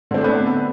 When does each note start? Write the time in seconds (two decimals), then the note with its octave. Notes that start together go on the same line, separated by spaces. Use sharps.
0.11 D3
0.14 C4
0.18 D4
0.21 A3
0.24 B3